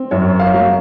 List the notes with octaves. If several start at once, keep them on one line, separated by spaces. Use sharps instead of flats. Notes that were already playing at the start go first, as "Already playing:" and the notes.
Already playing: C4
F#2 C#5
F5
F#3